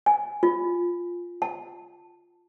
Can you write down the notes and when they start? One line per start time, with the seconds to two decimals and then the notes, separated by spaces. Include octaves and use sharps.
0.06 G#5
0.43 F4
1.42 A5